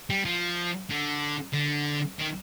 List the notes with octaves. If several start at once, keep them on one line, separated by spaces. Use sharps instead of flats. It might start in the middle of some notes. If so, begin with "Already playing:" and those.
G3
F3
D3
D3
D#3